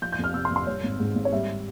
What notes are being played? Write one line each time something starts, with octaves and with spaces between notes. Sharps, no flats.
F3 G6
G6
F2
F6
C3 E6
C6
F2
C6
G3 C#5
G#1
G#2
G#1
C#5
G3 E5